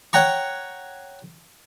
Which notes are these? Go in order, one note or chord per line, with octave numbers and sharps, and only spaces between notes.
C#5 F#5 G5 A#5 C#6